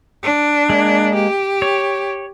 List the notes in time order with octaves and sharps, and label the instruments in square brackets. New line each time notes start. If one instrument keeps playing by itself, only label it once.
[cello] D4
[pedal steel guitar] G#3 A#3
[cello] G4
[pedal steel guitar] C#5